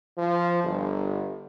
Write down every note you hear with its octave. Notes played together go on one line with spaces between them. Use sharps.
F3
G1